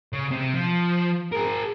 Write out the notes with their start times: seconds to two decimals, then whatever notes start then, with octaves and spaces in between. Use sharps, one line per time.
0.13 C#3
0.31 C3
0.54 F3
1.32 G#4 A#4